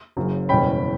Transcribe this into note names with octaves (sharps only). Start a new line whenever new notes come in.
F#1 F#2 C#3
F#1 E2 B2 G3 C#4 G5 B5